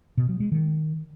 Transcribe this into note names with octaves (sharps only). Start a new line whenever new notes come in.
B2
F#3
G#3
D#3